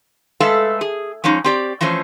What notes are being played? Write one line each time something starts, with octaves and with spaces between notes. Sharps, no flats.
G#3 A3 A4 B4 E5 F5
G#4
F3 G#3 C#4 D#4
C4 G4 D5
E3 F3 A3 C#4 C5